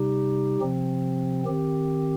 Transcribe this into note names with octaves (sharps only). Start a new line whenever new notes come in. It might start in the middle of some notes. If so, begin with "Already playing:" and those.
Already playing: C3 G3 D#4 G4
C3 F3 C4
D#3 C4 G4